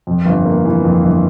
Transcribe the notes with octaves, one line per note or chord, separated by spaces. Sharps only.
F2
G1
A#3
E3
F2
G1